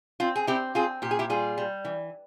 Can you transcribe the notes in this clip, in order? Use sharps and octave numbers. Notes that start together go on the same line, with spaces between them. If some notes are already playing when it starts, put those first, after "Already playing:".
C4 F4
G#4
C4 E4 G4
C4 F4 G#4
A#2 G4
G#4
E4 G4
G3 F4 G#4
G3
E3